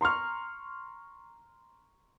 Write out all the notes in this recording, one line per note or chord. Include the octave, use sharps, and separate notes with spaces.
A#5 C6 C#6 F6